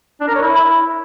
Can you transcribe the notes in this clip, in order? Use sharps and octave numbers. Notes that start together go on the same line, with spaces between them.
D4
A#4
C#5
E4